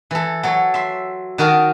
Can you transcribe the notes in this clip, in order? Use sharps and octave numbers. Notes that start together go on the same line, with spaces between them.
E3 A4
F#3 A4 C#5
E5 C6
D#3 F#4 A#4 D#5 A5